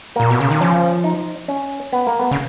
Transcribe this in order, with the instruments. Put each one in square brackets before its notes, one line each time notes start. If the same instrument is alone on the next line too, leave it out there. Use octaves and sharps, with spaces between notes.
[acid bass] A#2 [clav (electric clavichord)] A#3
[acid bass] B2
C#3
D#3
[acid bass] F3 [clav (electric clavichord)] C#4
[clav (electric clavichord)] D#4
C#4
B3
A#3
B3
[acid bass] C#3